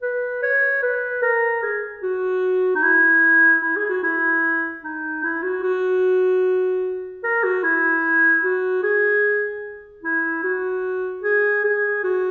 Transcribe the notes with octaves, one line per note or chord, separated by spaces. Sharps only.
B4
C#5
B4
A#4
G#4
F#4
D#4
E4
E4
G#4
F#4
E4
D#4
E4
F#4
F#4
A#4
F#4
E4
F#4
G#4
E4
F#4
G#4
G#4
F#4